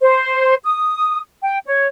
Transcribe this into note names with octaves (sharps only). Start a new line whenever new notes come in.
C5
D#6
G5
C#5